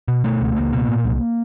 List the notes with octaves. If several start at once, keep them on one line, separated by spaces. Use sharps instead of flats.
B2
B2 A3
C#2
C#2 A#3
B2
A#2
C2